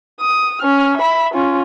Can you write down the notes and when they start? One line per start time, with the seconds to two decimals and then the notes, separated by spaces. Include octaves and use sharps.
0.21 D#6
0.62 C#4 F6
0.97 E5 B5
1.33 C#4 F4